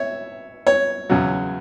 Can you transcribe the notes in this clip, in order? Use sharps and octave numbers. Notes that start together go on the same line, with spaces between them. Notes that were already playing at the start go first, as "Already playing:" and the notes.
Already playing: C#5 E5
C#5
E2 C#3 F#3